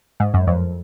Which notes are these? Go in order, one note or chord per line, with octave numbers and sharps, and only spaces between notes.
G#2
F#2
F2